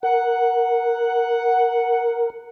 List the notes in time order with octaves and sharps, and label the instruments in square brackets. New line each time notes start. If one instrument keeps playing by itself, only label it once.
[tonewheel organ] A#4 [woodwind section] F#5